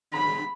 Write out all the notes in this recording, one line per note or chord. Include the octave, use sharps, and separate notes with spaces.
B5